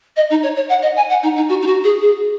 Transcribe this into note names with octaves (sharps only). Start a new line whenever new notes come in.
D#5
D#4
C#5
C#5
F#5
D#5
G#5
F#5
D#4
D#4
F#4
D#4
F#4
G#4
G#4